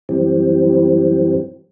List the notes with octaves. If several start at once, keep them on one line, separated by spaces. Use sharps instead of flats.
F#2 E3 G3 C4